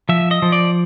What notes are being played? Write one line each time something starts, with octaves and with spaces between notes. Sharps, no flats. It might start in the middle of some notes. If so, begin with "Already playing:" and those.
F3 E5
D#5
F3
D5